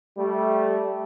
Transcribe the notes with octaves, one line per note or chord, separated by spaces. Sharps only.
G3 A3